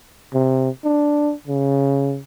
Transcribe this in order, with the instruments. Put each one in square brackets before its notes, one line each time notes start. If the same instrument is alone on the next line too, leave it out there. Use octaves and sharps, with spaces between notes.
[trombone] C3
D4
C#3